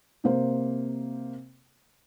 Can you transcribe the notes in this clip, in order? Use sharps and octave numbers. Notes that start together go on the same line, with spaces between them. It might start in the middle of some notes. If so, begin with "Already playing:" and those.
C3 A#3 C5